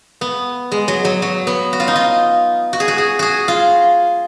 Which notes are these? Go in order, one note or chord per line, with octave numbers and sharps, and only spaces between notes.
B3
G#3
F#3
F#3
F#3
B3
F#4
F4
D#4
F4
F#4
G#4
F#4
G#4
F#4 G#4
F4